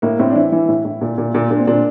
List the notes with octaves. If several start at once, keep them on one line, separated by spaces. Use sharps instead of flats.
A2 A#3
A2 C4
D4
E3 E4
E3
A2
A2
A#2
A#2
A#2
A#2 D4
C4
A#2 D4